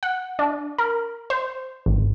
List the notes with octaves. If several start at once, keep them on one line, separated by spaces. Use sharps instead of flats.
F#5
D4
A#4
C5
G#1